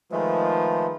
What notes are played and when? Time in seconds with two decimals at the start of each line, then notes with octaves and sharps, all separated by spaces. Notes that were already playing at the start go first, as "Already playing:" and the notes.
0.12 D#3 F3 G#3 A3 B4